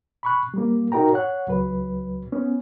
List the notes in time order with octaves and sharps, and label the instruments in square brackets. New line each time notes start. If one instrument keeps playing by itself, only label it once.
[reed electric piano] B5 C#6 F#6
G3 A#3
D#4 F#4 A#4 G5 A#5
C#5 F#5 F#6
C#2 F#3 B4
B3 C#4